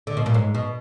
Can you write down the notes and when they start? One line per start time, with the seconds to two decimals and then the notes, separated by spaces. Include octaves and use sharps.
0.07 D3
0.17 B2
0.26 A#2
0.34 G#2
0.55 B2